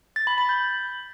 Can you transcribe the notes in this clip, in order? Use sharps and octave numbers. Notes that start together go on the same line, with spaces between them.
A6
B5
B5
G6